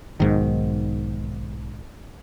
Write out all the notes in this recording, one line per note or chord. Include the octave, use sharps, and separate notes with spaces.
B1 G#2 D#3